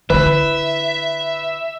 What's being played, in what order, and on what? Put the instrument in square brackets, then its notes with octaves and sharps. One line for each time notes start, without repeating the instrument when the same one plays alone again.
[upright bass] D3 E4 [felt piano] B4 [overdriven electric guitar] E5